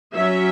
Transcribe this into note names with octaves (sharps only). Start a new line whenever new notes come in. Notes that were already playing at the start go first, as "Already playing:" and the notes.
F#3 C#4 E5